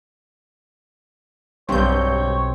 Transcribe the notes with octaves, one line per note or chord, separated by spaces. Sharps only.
B1 G2 C4 C#5 G6